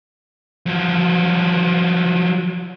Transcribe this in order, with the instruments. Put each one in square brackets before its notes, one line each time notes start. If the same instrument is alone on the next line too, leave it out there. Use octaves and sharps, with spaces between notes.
[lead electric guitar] F3 F#3